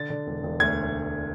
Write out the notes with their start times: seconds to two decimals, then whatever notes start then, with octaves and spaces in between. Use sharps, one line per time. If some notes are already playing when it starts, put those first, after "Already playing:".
Already playing: D3 A6
0.10 D3
0.27 E1
0.43 E1
0.60 D2 G#6